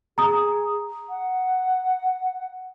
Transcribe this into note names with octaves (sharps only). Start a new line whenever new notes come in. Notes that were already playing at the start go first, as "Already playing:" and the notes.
G#4 A#5 D#6
F#5